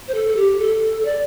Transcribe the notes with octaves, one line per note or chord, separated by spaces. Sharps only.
C5
A4
A4
G4
A4
D5